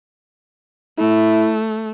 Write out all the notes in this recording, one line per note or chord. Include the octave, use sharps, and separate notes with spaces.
A3 E4